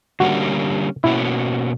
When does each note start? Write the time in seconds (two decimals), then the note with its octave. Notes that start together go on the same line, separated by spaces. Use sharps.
0.20 D3 G3 A#3 C#4 F#4
1.04 B2 A#3 C#4 E4 F#4